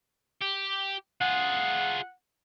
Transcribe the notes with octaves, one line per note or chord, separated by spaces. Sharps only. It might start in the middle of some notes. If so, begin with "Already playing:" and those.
G4
F4 G#4 F#5